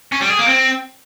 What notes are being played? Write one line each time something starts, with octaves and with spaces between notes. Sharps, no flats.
C#4
G3
G#4
A#3
C4